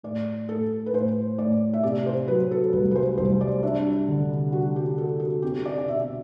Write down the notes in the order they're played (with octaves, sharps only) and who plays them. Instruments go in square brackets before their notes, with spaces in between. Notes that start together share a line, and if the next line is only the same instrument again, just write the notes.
[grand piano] A2 [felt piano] D5
[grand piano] A2 [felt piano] A4
[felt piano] B4
[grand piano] A2 [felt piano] C5
[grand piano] A2 [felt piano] D5
[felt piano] E5
[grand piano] C3 [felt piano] D5
[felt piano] C5
[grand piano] F#3 [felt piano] B4
[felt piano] A4
[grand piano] C2 [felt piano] B4
[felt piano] B4
C5
[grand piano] C2 [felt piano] C5
[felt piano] D5
[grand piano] D4 [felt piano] E5
[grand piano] D3
[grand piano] G3 [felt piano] F#4
[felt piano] G4
[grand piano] F#4 [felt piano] A4
[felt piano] A4
[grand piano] C4 [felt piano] G4
[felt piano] D5
D5
[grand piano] B2 [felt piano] E5